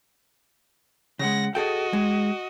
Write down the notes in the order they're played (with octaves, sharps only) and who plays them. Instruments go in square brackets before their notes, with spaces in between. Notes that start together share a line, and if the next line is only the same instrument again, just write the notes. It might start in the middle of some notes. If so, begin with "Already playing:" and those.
[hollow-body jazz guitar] C#3 G#3 [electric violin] F#5 A#6
[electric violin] F#4 D#5 [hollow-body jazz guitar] G#4 A4 G5
[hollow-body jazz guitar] G#3